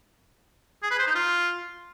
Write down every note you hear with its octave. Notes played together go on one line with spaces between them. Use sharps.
G#4
B4
C5
D#4
F4